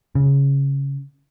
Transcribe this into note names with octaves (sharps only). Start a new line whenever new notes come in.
C#3